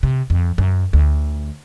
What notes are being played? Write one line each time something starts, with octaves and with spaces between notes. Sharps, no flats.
C3
F2
F#2
D2